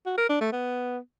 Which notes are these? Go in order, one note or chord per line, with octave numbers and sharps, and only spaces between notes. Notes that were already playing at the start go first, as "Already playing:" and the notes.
F#4
A#4
D4
A3
B3